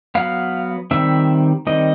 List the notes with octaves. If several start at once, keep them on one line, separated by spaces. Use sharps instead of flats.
F#3 B3 F5
D#3 G3 C4 E5
D#3 G3 C4 D#5